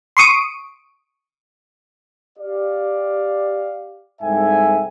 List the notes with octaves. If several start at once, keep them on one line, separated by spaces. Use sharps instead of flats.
C6 C#6 D#6 D7
G4 D5 F5
C2 G#2 A4 E5 G5 G#5